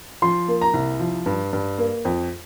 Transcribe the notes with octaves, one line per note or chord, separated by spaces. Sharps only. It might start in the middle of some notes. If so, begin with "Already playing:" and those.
F3 C6
A#3
A#5
C2
F3
G2
G2
A#3
F2